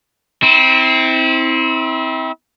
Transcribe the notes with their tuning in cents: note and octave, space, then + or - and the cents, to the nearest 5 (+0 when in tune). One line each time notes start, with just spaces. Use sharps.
C4 +0 E4 -35